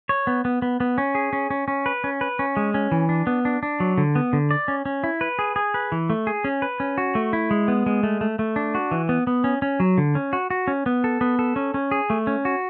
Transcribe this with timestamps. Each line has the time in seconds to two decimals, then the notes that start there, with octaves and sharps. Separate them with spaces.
0.09 C#5
0.27 B3
0.45 B3
0.62 B3
0.80 B3
0.98 C#4
1.15 G#4
1.33 C#4
1.50 C#4
1.68 C#4
1.86 B4
2.04 C#4
2.21 B4
2.39 C#4
2.57 G#3
2.74 C#4
2.92 E3
3.09 D4
3.27 B3
3.45 D4
3.63 D4
3.80 F#3
3.98 D3
4.15 B3
4.33 D3
4.51 D5
4.68 C#4
4.86 C#4
5.04 E4
5.21 B4
5.39 G#4
5.56 G#4
5.74 B4
5.92 E3
6.10 A3
6.27 G#4
6.44 C#4
6.62 B4
6.80 C#4
6.98 F#4
7.15 A3
7.33 E4
7.51 G#3
7.68 B3
7.86 G#3
8.03 A3
8.21 A3
8.39 A3
8.56 D4
8.75 F#4
8.91 E3
9.09 B3
9.27 B3
9.44 C#4
9.62 C#4
9.80 F#3
9.98 D3
10.15 C#4
10.33 F#4
10.50 F#4
10.68 C#4
10.86 B3
11.04 A4
11.21 B3
11.39 A4
11.56 C#4
11.74 C#4
11.91 G#4
12.10 A3
12.27 C#4
12.45 F#4